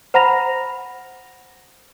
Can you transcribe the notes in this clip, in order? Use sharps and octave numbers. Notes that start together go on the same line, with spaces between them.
C5 F#5 A#5 B5 A#6 F7